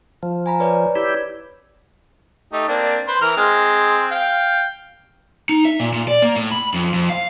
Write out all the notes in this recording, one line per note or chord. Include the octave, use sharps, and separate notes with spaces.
F3
G#5 A#5 B5
B4 C#5 D5
E4 G4
A3 D#4 G4
A#3 C4 D4
B4 C5
E3 A#4 F6
G#3 C4
F5 G5
D#4
E5
A#2
A#2
D5
A#3
A2
B5
F2
F2
F5